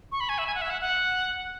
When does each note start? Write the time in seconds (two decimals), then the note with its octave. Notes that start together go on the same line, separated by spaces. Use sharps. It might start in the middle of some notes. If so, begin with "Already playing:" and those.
0.12 C#6
0.20 B5
0.29 G#5
0.38 E5
0.47 G#5
0.55 F#5
0.62 E5
0.70 F#5
0.81 F#5